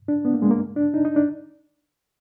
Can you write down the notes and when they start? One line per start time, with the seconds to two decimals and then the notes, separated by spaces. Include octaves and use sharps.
0.08 D4
0.25 B3
0.34 A#3
0.42 G#3
0.51 A#3
0.76 D4
0.94 D#4
1.05 D#4
1.16 D4